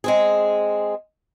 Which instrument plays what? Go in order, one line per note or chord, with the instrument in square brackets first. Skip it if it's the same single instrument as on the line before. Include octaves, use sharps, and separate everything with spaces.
[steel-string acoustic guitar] G#3 C4 G#4